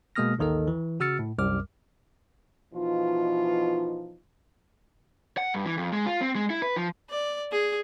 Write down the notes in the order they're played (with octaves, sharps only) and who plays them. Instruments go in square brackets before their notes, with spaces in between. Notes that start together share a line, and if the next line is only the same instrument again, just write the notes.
[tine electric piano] B2 G#3 A#3 D#6 F6 A#6
A1 D#2 D#3 A4 D#5
E3
C#3 F#4 E6 F6 A6 C#7
A2
C2 F#2 G3 D6 F6
[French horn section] B2 E3 F3 D#4 F4
[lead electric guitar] F#5
G2
E3
F2
G#3
F4
C4
G#3
E4
B4
F3
[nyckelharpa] D5
G#4